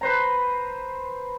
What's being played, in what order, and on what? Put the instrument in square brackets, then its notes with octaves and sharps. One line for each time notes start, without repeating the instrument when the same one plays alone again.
[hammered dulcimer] B4 C5 A#5